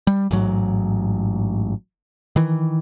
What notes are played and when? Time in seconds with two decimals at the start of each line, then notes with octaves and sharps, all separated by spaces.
0.07 G3
0.31 A1 G#2 F#3
2.36 D#3 E3